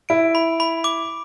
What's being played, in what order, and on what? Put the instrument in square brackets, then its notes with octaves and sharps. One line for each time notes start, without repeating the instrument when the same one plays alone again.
[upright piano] E4 [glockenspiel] D7
[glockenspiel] B5
B5
D6